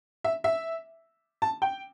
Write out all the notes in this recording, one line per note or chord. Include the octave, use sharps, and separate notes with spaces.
E5
E5
A5
G5